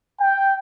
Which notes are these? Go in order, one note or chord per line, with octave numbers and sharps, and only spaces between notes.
G5